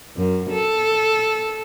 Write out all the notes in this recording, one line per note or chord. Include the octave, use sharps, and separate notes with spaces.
F#2
A4